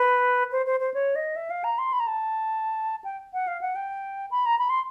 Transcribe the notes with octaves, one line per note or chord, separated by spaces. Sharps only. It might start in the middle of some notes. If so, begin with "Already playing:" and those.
Already playing: B4
C5
C5
C5
C#5
D#5
E5
F5
A#5
C6
B5
A#5
A5
G5
F#5
F5
F#5
G5
B5
A#5
B5
C6